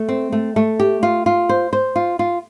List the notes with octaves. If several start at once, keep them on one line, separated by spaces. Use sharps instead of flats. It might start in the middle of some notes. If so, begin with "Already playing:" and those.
Already playing: A3
C4
A3
A3
G4
F4
F4
C5
C5
F4
F4